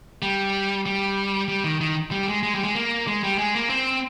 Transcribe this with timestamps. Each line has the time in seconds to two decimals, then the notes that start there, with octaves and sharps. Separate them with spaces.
0.22 G3
0.86 G3
1.48 G3
1.64 D#3
1.81 D#3
2.11 G3
2.28 G#3
2.43 G#3
2.55 G3
2.64 G#3
2.75 A#3
3.07 G#3
3.23 G3
3.38 G#3
3.55 A#3
3.70 C4